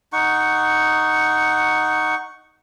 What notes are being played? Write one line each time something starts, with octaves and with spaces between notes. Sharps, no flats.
D#4 F#5 C#6